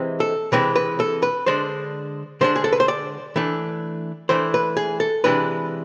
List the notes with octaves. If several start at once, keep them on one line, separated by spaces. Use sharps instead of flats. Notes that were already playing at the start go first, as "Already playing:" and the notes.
Already playing: C3 E3 G#3 C4
A4
C3 E3 G#3 C4 B4
B4
A4
B4
D3 G#3 D4 C5
D3 G#3 D4 C5
G#4
A4
B4
C5
D5
E3 A3 D4
E3 A3 D4 C5
B4
G#4
A4
C3 E3 G#3 D4 B4